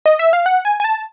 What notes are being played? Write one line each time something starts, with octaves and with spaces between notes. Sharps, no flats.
D#5
E5
F5
F#5
G#5
G#5
A5